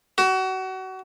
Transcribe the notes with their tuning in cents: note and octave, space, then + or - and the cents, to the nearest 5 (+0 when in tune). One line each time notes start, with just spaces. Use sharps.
F#4 +30